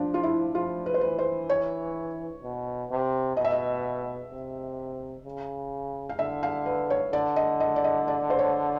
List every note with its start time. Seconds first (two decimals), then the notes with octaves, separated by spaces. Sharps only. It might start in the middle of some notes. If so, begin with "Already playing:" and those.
Already playing: F3 D4
0.14 F4
0.23 E4
0.55 F3 F4
0.86 B4
0.94 C5
1.01 E3 B4
1.19 C5
1.49 C#5
2.43 B2
2.91 C3
3.37 B2 D#5
3.44 E5
3.52 D#5
4.32 C3
5.25 C#3
6.09 F5
6.19 D3 E5
6.43 F5
6.66 B4
6.90 C#5
7.13 D3 D5
7.36 D#5
7.60 D#5
7.76 D5
7.84 D#5
8.08 D5
8.30 C5
8.39 C#5